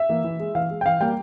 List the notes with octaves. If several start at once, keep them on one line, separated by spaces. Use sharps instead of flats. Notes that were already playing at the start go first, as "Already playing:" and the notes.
Already playing: E5
E3 A#3
E3
G#3
E3 F5
G#3
G5
E3 F5
G3 A#3 G5